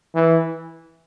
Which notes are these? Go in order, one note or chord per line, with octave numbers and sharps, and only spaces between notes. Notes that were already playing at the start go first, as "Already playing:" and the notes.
E3